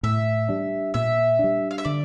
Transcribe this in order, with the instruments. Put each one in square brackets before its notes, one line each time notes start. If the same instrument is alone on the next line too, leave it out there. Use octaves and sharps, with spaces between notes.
[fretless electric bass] A2 [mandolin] E5
[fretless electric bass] G3 D4
[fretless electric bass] A#2 [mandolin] E5
[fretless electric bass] G3 D4
[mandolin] F5
E5
[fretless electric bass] D3 [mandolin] D5